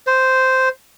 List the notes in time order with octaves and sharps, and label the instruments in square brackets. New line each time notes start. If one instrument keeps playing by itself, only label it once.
[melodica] C5